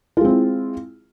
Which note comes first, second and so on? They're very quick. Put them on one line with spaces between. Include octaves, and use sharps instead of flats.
F4 G#3 C4 E4